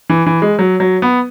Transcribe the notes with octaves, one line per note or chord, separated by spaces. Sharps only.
E3
E3
G#3
F#3
F#3
B3